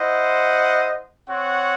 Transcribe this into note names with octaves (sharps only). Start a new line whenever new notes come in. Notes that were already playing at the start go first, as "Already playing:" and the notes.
Already playing: E4 C5 D#5 F#5
C4 F#4 C#5 F#5